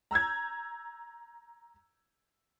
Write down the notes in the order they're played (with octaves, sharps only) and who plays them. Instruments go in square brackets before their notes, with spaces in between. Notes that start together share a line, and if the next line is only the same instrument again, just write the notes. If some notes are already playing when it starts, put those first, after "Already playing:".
[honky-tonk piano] A#5 E6 G6 G#6